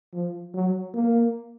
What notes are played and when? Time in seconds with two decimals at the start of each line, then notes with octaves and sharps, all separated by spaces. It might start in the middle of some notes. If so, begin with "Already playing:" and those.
0.13 F3
0.54 F#3
0.94 A#3